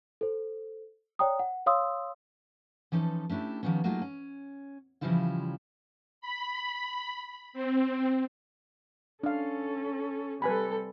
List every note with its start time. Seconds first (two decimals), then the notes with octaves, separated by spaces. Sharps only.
0.21 A4 C5
1.19 C#5 D5 G5 A#5 D#6
1.39 F#5
1.66 C#5 F5 C6 D#6 E6
2.92 E3 F3 C#4 D#4 A4
3.30 A3 C#4 D4 E4 G4
3.63 D#3 F3 G3 B3 C#4
3.84 F#3 A3 A#3 D#4 F4 G#4
4.02 C#4
5.01 C#3 E3 F3 G3 E4 F4
6.21 B5
7.53 C4
9.23 C#4 D4 A4 F5
10.42 C3 G3 A4 B4 G#5 B5